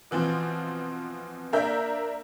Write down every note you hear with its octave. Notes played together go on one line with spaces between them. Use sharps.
B2 E3 F3 C4
A#3 D4 A#4 E5 G6